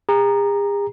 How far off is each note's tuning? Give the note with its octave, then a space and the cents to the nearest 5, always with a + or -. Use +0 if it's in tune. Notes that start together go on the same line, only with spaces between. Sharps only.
G#4 -45 A#5 +0